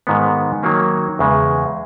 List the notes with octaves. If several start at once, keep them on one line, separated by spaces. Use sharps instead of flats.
G#2 D#3 G#3 B3
D#3 F#3 A#3 C#4
E2 C#3 G#3